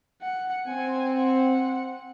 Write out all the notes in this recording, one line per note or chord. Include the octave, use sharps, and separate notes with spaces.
F#5
C4 G#5
F#5